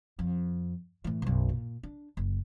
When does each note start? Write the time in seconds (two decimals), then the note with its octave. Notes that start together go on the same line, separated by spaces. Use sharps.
0.19 F2
1.04 A2 E3
1.22 B1 F#2
1.49 A#2
1.83 D4
2.17 F#1